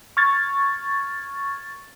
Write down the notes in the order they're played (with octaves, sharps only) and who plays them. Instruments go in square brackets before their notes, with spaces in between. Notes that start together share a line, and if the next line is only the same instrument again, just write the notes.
[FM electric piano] C#6 F6 G#6 A6